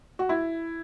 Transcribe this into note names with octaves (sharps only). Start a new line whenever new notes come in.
F#4
E4